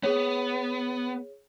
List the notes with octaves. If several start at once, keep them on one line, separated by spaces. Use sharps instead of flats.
B3 G#4 C#5